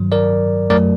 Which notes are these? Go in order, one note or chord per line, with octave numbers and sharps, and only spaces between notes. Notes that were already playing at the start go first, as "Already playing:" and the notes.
Already playing: G2 D#3 F#3
A#4 D5
F#2 F#3 A3 A#4 D5